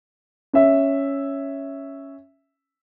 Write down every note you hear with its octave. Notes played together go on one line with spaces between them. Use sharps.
C#4 E5